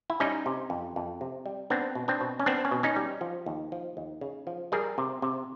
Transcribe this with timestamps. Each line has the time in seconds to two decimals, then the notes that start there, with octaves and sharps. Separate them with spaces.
0.10 E4
0.20 G3 C#4 D#4
0.46 C3
0.70 F2
0.96 F2
1.21 C3
1.46 G3
1.70 B3 C4 D4
1.95 B2
2.08 C4 D4
2.21 B2
2.40 C#4
2.46 B3 C4 D4
2.65 C#4
2.71 B2
2.83 C#4 D#4
2.96 G3
3.21 F3
3.46 D#2
3.72 F3
3.97 D#2
4.21 C#3
4.47 F3
4.72 G3 G#4 A#4
4.98 C3
5.22 C3